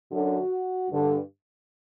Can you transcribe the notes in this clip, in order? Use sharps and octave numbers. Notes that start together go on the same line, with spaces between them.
F#2 D3 F#4
G2 D3